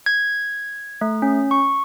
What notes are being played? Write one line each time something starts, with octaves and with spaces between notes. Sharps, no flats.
G#6
A3
C#4
C#6